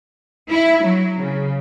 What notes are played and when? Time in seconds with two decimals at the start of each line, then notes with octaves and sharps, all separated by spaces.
0.50 E4
0.83 F#3
1.18 C#3